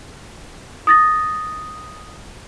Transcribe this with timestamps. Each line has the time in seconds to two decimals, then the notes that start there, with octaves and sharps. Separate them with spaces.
0.87 D#6 A6 A#6